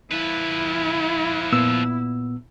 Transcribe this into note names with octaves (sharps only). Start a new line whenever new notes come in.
F3 E4 B4
A#2 B3 E6